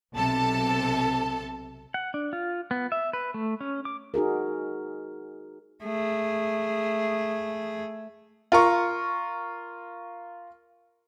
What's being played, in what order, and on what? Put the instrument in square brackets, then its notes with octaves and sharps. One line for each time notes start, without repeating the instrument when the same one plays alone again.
[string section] B1 C3 A4 A5
[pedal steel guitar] F#5
D4
F4
B3
E5
B4
A3
C#4
D6
[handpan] D#4 F#4 G#4 A#4
[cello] A3 G#4
[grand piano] F4 A#4 C#6